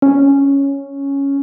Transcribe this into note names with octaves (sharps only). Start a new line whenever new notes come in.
C#4